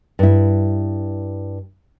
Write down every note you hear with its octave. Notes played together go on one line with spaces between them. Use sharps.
G2 E4